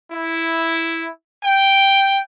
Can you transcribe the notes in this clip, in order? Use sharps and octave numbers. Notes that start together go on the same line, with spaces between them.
E4
G5